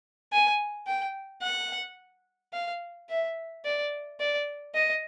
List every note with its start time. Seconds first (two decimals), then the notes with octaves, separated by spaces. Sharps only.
0.32 G#5
0.87 G5
1.42 F#5
2.53 F5
3.09 E5
3.65 D5
4.20 D5
4.75 D#5